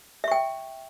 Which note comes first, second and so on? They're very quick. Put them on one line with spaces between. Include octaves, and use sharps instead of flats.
E5 C#6 G5